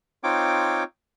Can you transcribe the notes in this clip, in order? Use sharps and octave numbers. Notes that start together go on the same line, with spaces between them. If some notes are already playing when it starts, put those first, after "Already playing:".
C4 D#4 F4 C#5 G5 D6